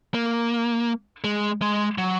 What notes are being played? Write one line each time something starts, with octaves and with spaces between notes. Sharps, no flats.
A#3
G#3
G#3
F#3